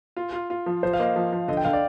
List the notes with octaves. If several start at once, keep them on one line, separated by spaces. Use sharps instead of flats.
F4
F4
F4
F3
F3 C5
F5
A#3 D#5
F3
F3
D3 D#5
G5
D3 F5
D5